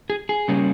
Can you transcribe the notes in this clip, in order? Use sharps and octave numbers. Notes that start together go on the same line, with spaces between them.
G#4
G#4
C#3 G3 A#3 C#4